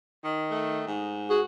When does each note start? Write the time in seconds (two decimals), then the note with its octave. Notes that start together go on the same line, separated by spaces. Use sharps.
0.24 D#3
0.51 A3
0.87 G#2
1.30 F#4 G#4